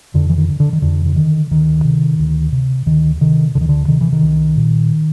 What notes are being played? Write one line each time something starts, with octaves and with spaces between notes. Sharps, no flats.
F2 D3
E3
D#3
D3
D3
D#3
F2 D3
D3
D3 D#3
D2 D#3
C3
D2
C3
D2 D#3
C3 D#3
D2 D3
D#3
D3
C3 D#3
E3
D#3
C2
A#2